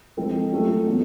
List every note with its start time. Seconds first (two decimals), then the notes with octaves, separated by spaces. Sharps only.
0.17 F3 G#3 C4 F4 A4
0.51 F#3 A3 C#4 F4
0.86 E3 G#3 B3